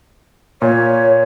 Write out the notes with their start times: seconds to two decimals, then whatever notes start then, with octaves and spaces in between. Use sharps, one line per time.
0.62 A#2 C#5